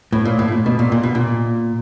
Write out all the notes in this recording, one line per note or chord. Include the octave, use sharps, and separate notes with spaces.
A2
A#2
A2
A#2
B2
A#2
A#2
B2
A#2